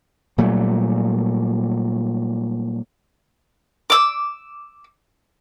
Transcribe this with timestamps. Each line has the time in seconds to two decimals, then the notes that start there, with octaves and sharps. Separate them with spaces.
0.38 A#2 F#3 G3 A3
3.90 D6 E6